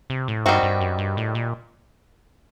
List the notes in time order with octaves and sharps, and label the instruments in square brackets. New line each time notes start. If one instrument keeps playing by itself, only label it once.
[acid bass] C3
A2
[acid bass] G2 [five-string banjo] D#3 G3 C4 F#4
[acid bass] G2
F#2
G2
A2
A#2